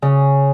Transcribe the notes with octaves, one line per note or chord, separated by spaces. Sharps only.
C#3